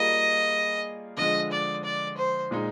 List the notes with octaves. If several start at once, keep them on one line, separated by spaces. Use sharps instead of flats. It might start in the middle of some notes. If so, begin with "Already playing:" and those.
Already playing: G3 A#3 F4 G#4 D#5
D3 F3 G#3 D#5
D5
D5
C5
A#2 G#3 D#4